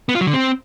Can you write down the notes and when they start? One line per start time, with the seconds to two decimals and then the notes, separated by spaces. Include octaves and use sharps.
0.09 B3
0.15 F4
0.21 F#3
0.27 D3
0.33 C4